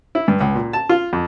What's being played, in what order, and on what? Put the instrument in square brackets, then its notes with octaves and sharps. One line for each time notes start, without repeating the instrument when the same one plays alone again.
[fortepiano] E4
G2
C#2
A#2
A5
F4
F2